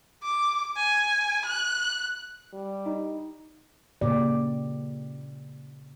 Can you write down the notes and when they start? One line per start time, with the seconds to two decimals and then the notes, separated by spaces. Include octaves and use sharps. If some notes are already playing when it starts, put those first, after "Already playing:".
0.23 D6
0.77 G#5
1.45 F#6
2.53 G3
2.86 D#4
4.01 A#2 C#3 G4 D5